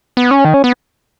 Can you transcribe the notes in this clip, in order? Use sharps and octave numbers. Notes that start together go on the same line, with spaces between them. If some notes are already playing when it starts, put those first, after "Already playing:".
B3
C#4
D#3
C#4
B3